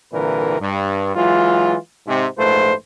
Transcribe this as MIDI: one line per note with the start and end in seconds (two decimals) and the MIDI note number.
0.13 0.56 36
0.13 0.56 46
0.13 0.56 50
0.13 0.56 52
0.13 0.56 70
0.13 0.56 71
0.60 1.14 43
1.16 1.76 52
1.16 1.76 54
1.16 1.76 56
1.16 1.76 65
2.07 2.27 44
2.07 2.27 48
2.07 2.27 60
2.39 2.73 34
2.39 2.73 44
2.39 2.73 57
2.39 2.73 65
2.39 2.73 71
2.39 2.73 72